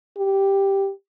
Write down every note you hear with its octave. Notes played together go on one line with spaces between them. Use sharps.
G4